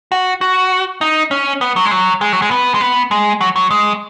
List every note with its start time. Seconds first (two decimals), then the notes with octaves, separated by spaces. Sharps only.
0.12 F#4
0.41 F#4
1.01 D#4
1.31 C#4
1.61 B3
1.76 F#3
1.86 G#3
1.91 F#3
2.21 G#3
2.33 F#3
2.42 G#3
2.51 B3
2.75 G#3
2.81 B3
3.11 G#3
3.41 F#3
3.56 F#3
3.71 G#3